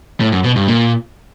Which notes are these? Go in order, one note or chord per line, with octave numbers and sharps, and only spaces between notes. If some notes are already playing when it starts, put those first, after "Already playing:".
A2
F#2
B2
G2
A#2